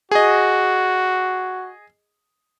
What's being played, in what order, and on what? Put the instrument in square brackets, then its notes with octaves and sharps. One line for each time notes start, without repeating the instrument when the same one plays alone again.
[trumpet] F#4 [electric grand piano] G#4 D#5